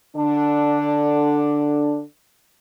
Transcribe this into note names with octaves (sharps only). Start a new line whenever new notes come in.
D3 D4